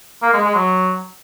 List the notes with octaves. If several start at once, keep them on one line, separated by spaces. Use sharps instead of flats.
A#3
G#3
G#3
F#3